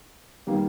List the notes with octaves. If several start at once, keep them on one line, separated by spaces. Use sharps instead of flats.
D#3 G3 A#3